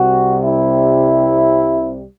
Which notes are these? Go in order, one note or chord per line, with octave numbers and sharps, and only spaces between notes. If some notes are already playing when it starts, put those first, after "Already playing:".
Already playing: C2 C3 G3 F#4
E4